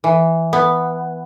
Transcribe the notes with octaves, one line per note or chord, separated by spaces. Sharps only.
E3
B3